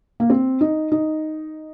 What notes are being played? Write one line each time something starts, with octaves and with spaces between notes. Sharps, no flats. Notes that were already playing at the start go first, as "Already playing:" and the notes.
A#3
C4
D#4
D#4